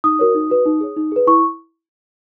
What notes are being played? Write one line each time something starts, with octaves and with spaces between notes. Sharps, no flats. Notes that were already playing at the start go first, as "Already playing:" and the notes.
D#4 D#6
F#4 A#4 C#5
D#4
F#4 B4
D#4
G#4 C#5
D#4
G#4 B4
E4 C#6